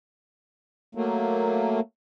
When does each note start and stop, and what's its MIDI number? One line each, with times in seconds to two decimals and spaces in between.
0.95 1.80 54
0.95 1.80 57
0.95 1.80 58